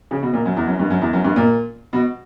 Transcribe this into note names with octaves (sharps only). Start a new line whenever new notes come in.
C#3
B2
A#2
F#2
E2
F#2
G2
F#2
E2
F#2
G2
A#2
B2